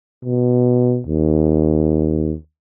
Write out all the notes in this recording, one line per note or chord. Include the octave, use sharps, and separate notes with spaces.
B2
D#2